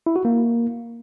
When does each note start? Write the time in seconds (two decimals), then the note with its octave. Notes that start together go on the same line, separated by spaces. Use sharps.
0.06 E4
0.16 F#4
0.25 A#3